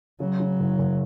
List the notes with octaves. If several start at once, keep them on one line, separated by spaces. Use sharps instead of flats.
C#3 F#3
C#3
F#1
F#1